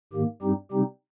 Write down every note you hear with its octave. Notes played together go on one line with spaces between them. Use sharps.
G#2 D#3 A#3 G4
G2 G3 C4 D#4 G4
C3 G3 C4 D#4 G4